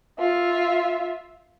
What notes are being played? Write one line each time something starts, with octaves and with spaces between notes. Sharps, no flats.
F4 E5